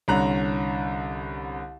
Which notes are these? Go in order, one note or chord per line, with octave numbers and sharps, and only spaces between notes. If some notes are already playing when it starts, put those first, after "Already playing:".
C2 D3 C#4 A#5 F#6